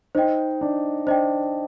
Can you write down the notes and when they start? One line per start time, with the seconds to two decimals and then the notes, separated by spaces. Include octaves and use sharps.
0.15 D#4 C5 D#5 G5
0.61 D4
1.07 D4 C5 D#5 G5